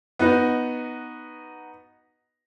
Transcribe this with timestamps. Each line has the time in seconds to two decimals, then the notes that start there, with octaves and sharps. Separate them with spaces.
0.19 B3 D#4 F#4